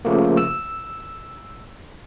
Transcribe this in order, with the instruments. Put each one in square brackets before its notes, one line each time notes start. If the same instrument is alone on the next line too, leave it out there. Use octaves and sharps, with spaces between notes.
[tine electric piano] C#3 F3 A3 A#3
E6